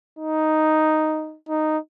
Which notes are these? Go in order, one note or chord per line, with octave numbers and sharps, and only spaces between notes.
D#4
D#4